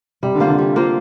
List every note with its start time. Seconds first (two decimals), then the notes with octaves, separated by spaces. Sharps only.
0.23 C3 G3
0.35 D3
0.40 A#3 F4 C5
0.47 D3
0.59 G3
0.76 A#3 F4 C5